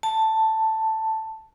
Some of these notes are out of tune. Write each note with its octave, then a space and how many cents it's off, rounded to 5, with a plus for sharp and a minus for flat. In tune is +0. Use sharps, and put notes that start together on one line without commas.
A5 +5